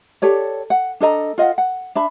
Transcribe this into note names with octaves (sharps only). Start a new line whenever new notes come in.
G4 A4 C#5 D5
F#5
D4 A4 D#5 A#5
F4 D#5 F5 F#5
F#5
D4 E5 B5